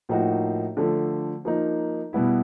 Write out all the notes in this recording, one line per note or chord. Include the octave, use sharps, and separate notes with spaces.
A2 F3 A#3 D#4 F#4
D3 F3 A3
F3 A#3 D#4
B2 G3 B3 E4